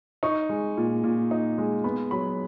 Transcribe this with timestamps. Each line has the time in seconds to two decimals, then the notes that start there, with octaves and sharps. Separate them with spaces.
0.23 D#4 C#6
0.49 G#3
0.77 A#2
1.04 A#2
1.31 D#4
1.58 G#3
1.84 B3 B5
2.11 F#3 B5